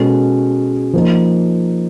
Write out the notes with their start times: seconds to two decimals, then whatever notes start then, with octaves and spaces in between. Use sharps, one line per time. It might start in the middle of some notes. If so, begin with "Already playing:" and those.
Already playing: B2 G#3 C#4 F#4 A4
0.93 F3 A#3 D#4